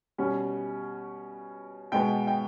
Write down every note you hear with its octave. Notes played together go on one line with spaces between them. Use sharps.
B2 G3 C#4
B2 G#3 B3 G5
G5